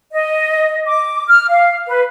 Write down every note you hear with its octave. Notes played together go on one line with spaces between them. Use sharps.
D#5
D6
F6
F5
B4